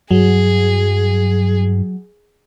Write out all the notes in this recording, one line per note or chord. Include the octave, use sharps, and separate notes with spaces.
G2 F#3 G#4